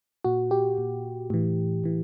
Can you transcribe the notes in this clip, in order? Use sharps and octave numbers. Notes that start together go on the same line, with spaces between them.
A#2 F#4
G4
A#2
A2 E3
A2 E3